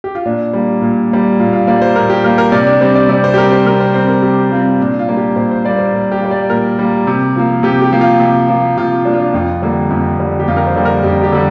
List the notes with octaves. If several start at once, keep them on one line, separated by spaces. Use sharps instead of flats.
G4
F4
A#2 D4
G3 A#3
A#2
G3 A#3
A#2 F4
F4
G3 A#3 D5
C5
A#2 A#4
G4
G3 A#3 A#4
A#4
C3 D5
D4
G3 C4 C5
D5
C3 D5
C5
G4
G3 C4 A#4
C5
C3 A#4
C5
G3 C4 C5
A#4
C3 G4
G3 C4 F4
A#2 D4
F4
G3 A#3
G4
A#2 C5
C5
G3 A#3 D5
C5
A#2
G4
G3 A#3
D5
A#2 A#4
G3 A#3
C3
F3 A#3
C3 G4
G4
F3 A#3
F4
C3
F3 A#3
C3 F4
F3 A#3 D4
F4
D4
F2 F4
D3 G3 A#3
F2
D3 G3 A#3
G4
F2 F4
A#4
C5
D3 G3 A#3
A#4
F2 G4
G4
D3 G3